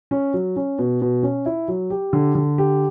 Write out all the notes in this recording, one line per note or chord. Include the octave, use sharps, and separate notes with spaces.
C#4
F#3
C#4
B2
B2
C#4
E4
F#3
G4
D3
D3
G4